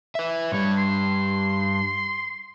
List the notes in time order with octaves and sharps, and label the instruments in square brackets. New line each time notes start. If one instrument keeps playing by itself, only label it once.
[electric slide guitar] B4 E5
[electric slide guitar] G2 G3 [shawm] C#5
[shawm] C6